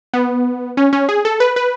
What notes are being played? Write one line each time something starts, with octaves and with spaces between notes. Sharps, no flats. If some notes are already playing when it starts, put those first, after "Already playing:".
B3
C#4
C#4
G#4
A4
B4
B4